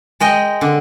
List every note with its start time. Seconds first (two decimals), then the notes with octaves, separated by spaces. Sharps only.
0.20 G#3 D#5 G5
0.61 D3